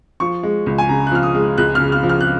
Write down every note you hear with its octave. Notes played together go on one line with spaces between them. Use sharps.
F3 C#6
G#3
C#2
G#5
C#3 A#5
F#6
F3 F6
D#6
G#3
C#2 F#6
F6
C#3
F6
F3
F6
F#6